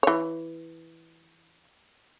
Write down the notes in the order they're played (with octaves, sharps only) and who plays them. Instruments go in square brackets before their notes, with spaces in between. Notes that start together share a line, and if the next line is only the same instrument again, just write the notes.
[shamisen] E3 C#5